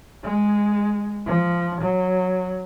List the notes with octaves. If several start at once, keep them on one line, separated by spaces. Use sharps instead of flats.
G#3
F3
F#3